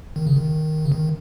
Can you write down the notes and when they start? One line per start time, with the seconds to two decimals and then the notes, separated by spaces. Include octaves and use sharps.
0.16 D#3
0.27 C#3
0.36 D#3
0.85 C#3
0.92 D#3